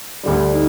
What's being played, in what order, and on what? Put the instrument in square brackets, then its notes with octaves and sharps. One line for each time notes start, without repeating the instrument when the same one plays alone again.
[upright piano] D2 D3 G3
[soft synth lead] D#4